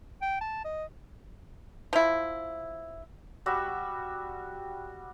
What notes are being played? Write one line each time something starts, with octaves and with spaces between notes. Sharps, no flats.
G5
A5
D#5
F3 E4
G3 F#4 E5